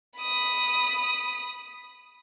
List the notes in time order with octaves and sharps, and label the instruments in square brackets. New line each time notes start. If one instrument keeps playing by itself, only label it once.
[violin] B5 D#6